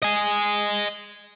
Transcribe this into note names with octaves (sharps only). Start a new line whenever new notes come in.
D#5 G#5